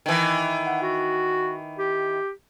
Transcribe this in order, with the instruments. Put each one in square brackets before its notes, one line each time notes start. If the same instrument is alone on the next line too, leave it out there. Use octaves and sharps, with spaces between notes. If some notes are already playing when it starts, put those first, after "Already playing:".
[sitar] D#3 E3
[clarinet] F#5
F#4
G4